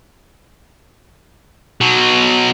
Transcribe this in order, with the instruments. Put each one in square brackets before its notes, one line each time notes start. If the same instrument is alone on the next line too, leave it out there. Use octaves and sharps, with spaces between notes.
[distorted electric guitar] B2 F#3